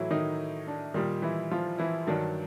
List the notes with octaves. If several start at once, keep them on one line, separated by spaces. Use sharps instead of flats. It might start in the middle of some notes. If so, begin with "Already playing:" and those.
Already playing: A2 E3 F#3 E4
D#3 D#4
D4
A#2 D#3 G3 D#4
E3 E4
F3 F4
E3 E4
G2 D#3 F#3 D4